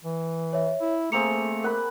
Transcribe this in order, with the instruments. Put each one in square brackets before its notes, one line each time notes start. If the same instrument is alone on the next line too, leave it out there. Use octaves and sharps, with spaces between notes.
[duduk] E3
[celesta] C#5 E5
[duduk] E4
[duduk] A3 [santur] A#3 C4 G#4 [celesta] C#7 F7
[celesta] A#4 [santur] F#5 B5